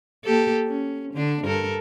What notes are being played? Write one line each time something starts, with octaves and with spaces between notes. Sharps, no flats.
A#3 G4 A4
C#4
D3 D4
G2 A4 A#4